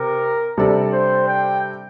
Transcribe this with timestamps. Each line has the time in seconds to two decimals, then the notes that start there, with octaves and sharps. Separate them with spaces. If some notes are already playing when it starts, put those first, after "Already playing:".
Already playing: C3 A#4
0.58 C3 G3 D4 A4 D5
0.92 C5
1.28 G5